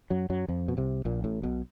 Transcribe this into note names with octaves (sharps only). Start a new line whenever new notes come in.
F#2 F#3
F#2 F#3
F2 F3
B2
C2 C3
A#1 A#2
A1 A2
B1 B2